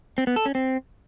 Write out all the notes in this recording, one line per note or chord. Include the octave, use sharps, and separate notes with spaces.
C4
B3
A4
C#4
C4